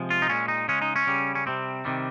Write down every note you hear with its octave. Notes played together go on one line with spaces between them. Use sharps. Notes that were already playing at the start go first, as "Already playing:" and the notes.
Already playing: C3 F3 G#3
F4
D#4
A#2 G#3 C#4
D#4
C#3 G#3 C#4
D#4
C#4
C#3 G3
C#4
C3 G3 C4
C3 D#3 G3